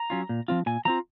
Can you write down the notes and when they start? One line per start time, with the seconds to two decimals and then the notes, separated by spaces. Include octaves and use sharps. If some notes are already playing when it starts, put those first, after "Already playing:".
Already playing: A#5
0.10 F#3 C#4 F4
0.29 A#2
0.48 F3 C4 F4
0.66 A#2 G#5
0.85 F3 C4 F4 A#5